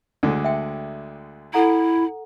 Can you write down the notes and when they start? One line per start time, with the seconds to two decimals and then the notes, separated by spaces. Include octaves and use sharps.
0.23 D2 D3 G#3
0.44 E5 G5
1.54 E4 A4 F#5 A#5